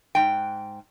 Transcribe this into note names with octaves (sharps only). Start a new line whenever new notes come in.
G#2 G5